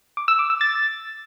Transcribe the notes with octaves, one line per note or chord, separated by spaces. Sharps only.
D6
E6
D6
E6
A6